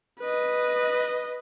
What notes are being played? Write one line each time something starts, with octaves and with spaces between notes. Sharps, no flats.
B4 D#5